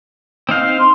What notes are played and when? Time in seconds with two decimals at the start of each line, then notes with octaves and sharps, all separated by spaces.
0.49 C4 D#4 F5
0.78 C6